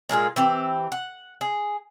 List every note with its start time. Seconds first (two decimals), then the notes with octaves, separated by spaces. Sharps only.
0.09 A#2 G#3 F4 G#4
0.36 E3 C4 G4
0.92 F#5
1.41 G#4